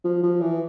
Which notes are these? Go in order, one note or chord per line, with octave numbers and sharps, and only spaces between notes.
F3
F3
E3